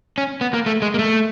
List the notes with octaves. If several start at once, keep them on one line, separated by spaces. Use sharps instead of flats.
C#4
B3
A#3
A3
G#3
A#3
A3